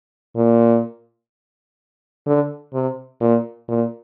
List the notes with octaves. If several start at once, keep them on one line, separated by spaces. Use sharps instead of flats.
A#2
D3
C3
A#2
A#2